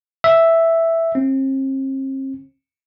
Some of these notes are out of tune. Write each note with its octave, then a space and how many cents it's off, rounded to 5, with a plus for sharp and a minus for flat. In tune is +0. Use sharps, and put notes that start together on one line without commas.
E5 +0
C4 +40